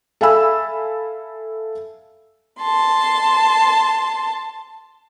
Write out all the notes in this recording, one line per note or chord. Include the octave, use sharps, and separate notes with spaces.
A4 E5 F5 G#5 B5 E6
A5 C6